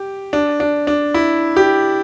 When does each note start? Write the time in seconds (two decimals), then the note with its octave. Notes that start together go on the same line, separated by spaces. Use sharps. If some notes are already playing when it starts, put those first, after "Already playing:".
Already playing: G4
0.33 D4
0.60 D4
0.87 D4
1.14 E4
1.57 G4